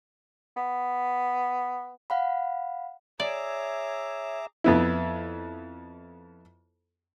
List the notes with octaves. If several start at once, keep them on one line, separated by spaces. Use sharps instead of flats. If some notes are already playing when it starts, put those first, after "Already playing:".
B3
F5 F#5 B5
G#4 C#5 D5 E5 A#5 D6
F2 B3 E4